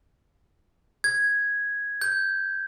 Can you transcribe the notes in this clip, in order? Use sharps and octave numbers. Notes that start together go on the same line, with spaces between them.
G#6
G6